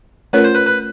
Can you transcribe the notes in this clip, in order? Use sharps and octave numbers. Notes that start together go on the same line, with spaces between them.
A3 C#4 F4 A#4 B4 C#5
C5
B4
B4